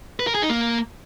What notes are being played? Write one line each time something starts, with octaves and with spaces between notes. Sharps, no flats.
B4
A#4
G#4
D#4
A#3